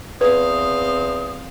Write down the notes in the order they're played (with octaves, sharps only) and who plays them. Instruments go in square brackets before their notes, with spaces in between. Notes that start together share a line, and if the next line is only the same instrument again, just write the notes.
[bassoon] E2 [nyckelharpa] C4 F5 [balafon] B4 [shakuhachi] D#6